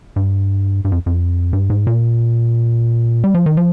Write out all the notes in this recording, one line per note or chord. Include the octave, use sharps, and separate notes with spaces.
G2
G2
F2
F2
G2
G#2
A#2
G3
F3
D#3
F3